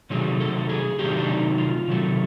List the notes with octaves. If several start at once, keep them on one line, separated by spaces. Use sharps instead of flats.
C3 D#3 F#3 A3 G#4
A4
G#4
C3 D#3 F#3 A3 G4
D4
D#4
F4
C3 D#3 F#3 A3